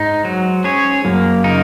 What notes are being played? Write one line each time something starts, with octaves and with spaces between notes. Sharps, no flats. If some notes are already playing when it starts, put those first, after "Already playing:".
Already playing: G#2 G#3 D#4
F#3
C#4 G#4 C#5
F#2 F#3 A#3
C#3 D#4 A#4